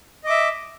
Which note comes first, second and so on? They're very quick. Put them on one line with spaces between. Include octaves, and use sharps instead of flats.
D#5 D6 E5